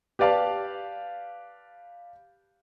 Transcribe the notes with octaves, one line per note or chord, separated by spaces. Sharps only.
G4 B4 D5 F5 A5